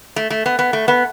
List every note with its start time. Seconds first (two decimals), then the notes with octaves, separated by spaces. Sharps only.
0.16 A3
0.30 A3
0.46 B3
0.59 B3
0.73 A3
0.88 B3